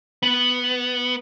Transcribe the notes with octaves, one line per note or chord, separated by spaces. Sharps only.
B3